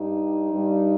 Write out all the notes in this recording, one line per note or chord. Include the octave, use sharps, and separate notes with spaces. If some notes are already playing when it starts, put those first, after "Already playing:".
Already playing: G2 G3 D#4
G2 G3